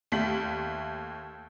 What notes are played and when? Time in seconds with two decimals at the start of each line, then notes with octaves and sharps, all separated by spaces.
0.12 D#2 A3 B6 F#7